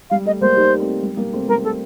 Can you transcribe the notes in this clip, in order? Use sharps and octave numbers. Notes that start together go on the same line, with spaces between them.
G3 F5
A3 D#5
G3 A#3 C5
D#4 G4
A3 C4
G3
G3 A#3
A3 C4
G3 A#3 A#4
A3 A4